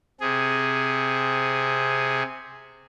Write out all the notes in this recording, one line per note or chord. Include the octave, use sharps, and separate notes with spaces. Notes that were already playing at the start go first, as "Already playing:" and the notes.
C3 G#4